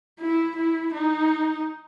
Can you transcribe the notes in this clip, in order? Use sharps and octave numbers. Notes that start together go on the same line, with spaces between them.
E4
E4
D#4